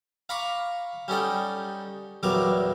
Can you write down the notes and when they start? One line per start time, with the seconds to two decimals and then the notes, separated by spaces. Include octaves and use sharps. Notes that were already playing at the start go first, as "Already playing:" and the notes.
0.29 F5 A#5 B5 C#6 D6
1.08 G3 C#4 D#4 A4 F#5 G5
2.23 A#1 E2 F#3 G3 A#4 D6